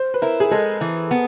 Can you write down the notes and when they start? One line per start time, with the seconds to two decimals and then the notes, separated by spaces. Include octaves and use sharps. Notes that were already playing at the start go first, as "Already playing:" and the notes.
Already playing: C5
0.14 B4
0.22 E4 A#4
0.40 G#4
0.51 G#3 A4
0.81 E3
1.11 B3